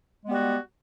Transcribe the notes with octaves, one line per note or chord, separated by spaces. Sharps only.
G3 G#3 B3 F#4